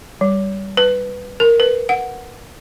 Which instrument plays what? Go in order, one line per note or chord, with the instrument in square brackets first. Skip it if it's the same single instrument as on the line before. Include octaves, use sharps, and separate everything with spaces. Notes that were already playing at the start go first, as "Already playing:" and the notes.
[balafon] G3
B4
A#4
B4
F#5